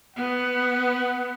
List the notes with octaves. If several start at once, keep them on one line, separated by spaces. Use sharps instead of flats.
B3 F#5